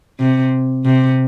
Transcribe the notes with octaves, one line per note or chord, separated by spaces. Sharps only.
C3
C3